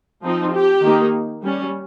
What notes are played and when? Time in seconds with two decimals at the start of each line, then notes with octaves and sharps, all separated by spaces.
0.24 F3 C4 D#4
0.54 G4
0.83 D#3 A#3 D#4
1.43 G3 C#4